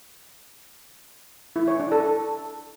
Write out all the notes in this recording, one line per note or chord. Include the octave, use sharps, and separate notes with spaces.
E4
C#5
D4
A4